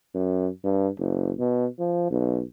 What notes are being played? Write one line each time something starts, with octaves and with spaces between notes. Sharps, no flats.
F#2
G2
F#1
B2
F3
B1